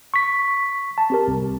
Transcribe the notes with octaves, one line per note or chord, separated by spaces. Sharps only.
C#6 B6
A5
C4 G4 A#4
C2